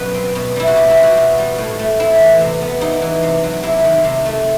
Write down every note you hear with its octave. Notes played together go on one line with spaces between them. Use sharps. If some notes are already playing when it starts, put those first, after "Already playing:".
Already playing: F#2 B2 F#3 B4
C4
B2
G3 E4
F#4
B2 G4
E4
C4
F#4
B2
G3
A2
A3
C4 E4
E3
C3
B3
C3 D#4
E3
C3
F#3
C3 E4
D#3
C3
A3